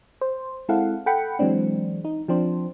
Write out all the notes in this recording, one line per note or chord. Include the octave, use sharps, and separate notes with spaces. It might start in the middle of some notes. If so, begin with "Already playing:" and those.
C5
G#3 C4 E4 A4 F5 F#5
A4 F#5 G5 B5 C#7
E3 F#3 G#3 C4 D4
D#4
F3 C4 D4 C5